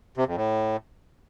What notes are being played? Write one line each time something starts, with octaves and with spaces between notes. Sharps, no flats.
C3
F2
A2